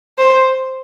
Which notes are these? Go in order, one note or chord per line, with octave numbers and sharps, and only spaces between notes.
C5